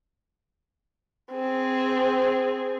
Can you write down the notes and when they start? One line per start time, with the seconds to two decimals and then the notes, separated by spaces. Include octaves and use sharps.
1.33 C4 G#4